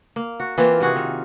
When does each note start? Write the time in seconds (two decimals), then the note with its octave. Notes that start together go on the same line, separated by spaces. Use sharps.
0.16 A#3
0.40 F#4
0.58 E3 A#3 C4 F4
0.80 C3 F4 F#4 G#4
0.96 D#3